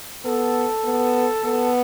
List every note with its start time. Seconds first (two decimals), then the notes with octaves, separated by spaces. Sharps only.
0.24 B3 A4
0.84 B3
1.44 B3 A4